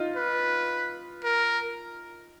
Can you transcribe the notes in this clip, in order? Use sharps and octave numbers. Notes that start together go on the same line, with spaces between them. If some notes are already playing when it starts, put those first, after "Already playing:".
Already playing: D#4 F4
B4
A#4